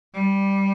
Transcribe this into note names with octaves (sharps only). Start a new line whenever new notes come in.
G3